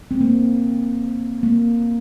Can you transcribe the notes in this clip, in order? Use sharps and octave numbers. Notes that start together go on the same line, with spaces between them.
C4
A#3
A#3